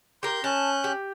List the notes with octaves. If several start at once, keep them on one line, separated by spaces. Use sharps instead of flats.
G4 A#4 C6 G6
C#4 A5 F#6 G6
G4